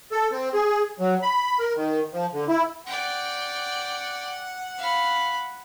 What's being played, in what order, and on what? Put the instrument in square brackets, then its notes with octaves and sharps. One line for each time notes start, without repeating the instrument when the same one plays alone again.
[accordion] A4
C4
G#4
F#3
B5
A#4
D#3
F3
D3
E4
[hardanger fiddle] D5 G5 [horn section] F#5
[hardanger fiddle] F5 B5